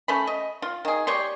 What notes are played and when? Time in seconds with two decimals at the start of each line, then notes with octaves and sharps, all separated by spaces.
0.08 A3 C#4 B5
0.27 D#5
0.62 F4
0.85 D#3 G#4
1.07 G3 G4 C#5 C6